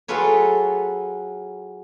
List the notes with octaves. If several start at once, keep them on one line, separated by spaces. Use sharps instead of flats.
F#3 F4 G#4 A4 B4 C#5